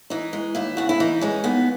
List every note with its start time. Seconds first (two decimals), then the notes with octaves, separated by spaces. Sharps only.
0.10 E3 D#4
0.33 G#3
0.55 D#2 E4
0.77 C#3 F#4
0.89 E4
1.00 E3 D#4
1.21 G#3 C#4
1.44 D#2 B3